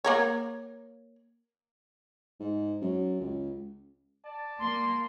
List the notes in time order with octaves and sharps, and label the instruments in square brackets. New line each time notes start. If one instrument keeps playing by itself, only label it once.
[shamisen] A#3 A#4 C#5
[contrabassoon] G#2
F#2
C#2
[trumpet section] D5 A5
[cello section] A#3 [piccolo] C6